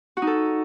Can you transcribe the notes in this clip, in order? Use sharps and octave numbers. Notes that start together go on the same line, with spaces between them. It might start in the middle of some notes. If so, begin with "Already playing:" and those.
F#4
D#4
A4